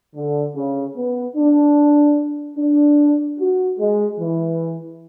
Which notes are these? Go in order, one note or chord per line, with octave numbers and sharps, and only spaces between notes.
D3
C#3
B3
D4
D4
F#4
G#3
E3